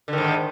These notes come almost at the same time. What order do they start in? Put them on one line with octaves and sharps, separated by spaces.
D3 D#3 G#2